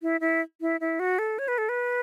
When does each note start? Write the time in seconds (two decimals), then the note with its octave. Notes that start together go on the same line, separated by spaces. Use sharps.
0.02 E4
0.21 E4
0.61 E4
0.81 E4
1.00 F#4
1.19 A4
1.39 C#5
1.48 B4
1.58 A4
1.69 B4